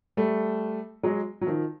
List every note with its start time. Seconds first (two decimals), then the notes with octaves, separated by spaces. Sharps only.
0.17 G3 A3
1.03 F#3 G#3
1.41 F#3
1.47 D#3 F3